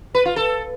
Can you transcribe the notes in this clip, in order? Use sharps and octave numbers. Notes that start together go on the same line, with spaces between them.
B4
F4
A4